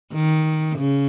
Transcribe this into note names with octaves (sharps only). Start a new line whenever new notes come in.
D#3
C#3